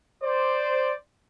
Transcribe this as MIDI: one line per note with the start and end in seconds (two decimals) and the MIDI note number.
0.24 0.94 72
0.24 0.94 74